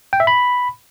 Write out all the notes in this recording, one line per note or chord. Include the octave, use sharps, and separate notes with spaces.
G5
E5
B5